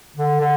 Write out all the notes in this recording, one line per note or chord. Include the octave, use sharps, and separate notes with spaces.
D3
D3